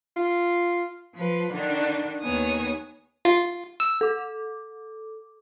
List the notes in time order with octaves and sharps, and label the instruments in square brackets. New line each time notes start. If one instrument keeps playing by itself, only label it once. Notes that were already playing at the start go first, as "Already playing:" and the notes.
[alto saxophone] F4
[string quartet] F3 F4 B4
D3 D#3 D4
D#2 D#3 B3 C#5 G#5 D#6
[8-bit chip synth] F4
E6
[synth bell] A4 D6